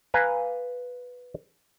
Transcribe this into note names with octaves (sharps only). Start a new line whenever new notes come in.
B4 F5 G#5 A#5